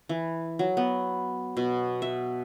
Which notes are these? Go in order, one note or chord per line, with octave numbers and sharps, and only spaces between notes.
E3
F#3
B3
B2
E5